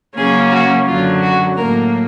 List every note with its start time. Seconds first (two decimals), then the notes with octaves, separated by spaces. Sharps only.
0.17 C#3 F#3 A#3 C#4 G#4
0.51 F#4
0.87 F#2 D3 F#3 F4
1.22 F#4
1.56 A2 F#3 A#3 A#4